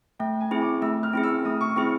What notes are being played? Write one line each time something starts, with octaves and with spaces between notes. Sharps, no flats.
A3 G5
G#5
C4 E4 G#4
D6
A3 E6
F6
C4 E4 G#4
E6
A3 D#6
C#6
C4 E4 G#4 C#6